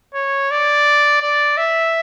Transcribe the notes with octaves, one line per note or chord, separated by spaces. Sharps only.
C#5
D5
D5
E5